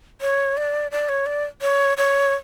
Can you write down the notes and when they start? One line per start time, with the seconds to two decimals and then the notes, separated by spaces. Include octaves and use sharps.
0.21 C#5
0.57 D5
0.91 D5
1.09 C#5
1.26 D5
1.62 C#5
1.97 C#5